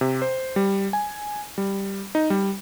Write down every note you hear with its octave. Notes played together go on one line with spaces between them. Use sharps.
C3
C5
G3
G#5
G3
D#4
G3